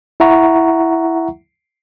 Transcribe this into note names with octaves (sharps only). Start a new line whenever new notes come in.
E4 E5 F#5 A#5 C#6